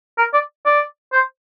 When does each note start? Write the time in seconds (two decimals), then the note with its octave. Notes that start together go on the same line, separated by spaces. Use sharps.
0.18 A#4
0.34 D5
0.66 D5
1.13 C5